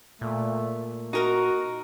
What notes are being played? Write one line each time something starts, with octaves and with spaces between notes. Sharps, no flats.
A#2 A3
D#4 F#4 A#4 A#5